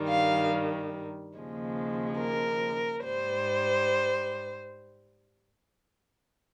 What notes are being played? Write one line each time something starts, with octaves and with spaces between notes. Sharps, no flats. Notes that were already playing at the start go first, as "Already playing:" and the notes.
Already playing: G2 D#3 G3
F5
D#2 C#3 F3 G#3
A#4
G#2 G3 C5